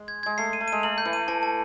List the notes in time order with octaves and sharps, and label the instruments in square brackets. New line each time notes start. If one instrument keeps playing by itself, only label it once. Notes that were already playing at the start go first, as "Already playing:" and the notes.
Already playing: [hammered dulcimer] G#3
[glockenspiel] G#6
[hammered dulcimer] G#3 [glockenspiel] G#6
[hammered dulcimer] A3 [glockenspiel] C7
[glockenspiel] D#7
[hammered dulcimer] A3
[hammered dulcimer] G#3 [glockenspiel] D#7
[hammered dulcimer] A3 [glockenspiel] F#7
[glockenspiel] G6
[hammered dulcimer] E3
[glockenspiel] D#7
[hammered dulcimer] E3 [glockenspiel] A5
[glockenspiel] A5